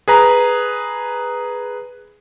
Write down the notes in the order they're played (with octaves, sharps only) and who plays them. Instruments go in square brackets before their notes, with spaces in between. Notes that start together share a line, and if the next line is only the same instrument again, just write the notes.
[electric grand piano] G#4 B4 A#5